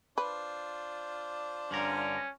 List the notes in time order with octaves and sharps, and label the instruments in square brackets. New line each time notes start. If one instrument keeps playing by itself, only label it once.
[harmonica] D4 F4 C5 [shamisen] B4
[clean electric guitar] G2 D3 A#4 [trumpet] C#4